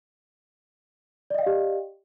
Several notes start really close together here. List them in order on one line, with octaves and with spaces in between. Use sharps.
D5 D#5 G5 F5 G4